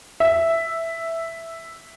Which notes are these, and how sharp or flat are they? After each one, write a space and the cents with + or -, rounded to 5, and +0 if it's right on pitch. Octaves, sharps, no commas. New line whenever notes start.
E5 +0